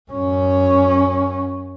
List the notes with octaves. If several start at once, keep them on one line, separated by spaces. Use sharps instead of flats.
F#2 C#4